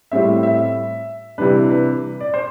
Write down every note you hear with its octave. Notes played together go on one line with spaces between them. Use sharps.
A2 G3 C4 E5
E5
C3 E3 G3 D4 B4
B4
D5
C5